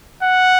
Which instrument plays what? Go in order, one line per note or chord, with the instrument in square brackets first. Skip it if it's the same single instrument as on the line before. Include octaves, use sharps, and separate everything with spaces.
[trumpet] F#5